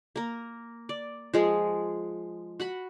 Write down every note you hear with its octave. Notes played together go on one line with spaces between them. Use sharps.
A#3 A#4
D5
F3 G#3 G#4
F#4 F#5 B5